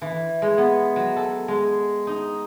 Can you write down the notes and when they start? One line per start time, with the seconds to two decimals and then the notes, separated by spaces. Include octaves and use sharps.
0.02 E3
0.42 G#3
0.58 B3
0.96 F#3
1.16 A4
1.48 G#3
2.07 D#4